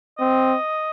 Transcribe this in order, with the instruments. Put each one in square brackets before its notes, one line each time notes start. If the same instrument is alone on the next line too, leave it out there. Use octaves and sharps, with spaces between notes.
[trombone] C4 [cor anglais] D#5